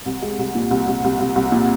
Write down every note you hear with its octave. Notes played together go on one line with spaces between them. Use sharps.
C2
G#3
C2
A#2
C2
C2
C2
C2
C2
A#2